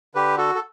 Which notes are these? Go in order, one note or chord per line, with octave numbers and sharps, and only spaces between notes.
D3 G4 B4
F#4 A4
A4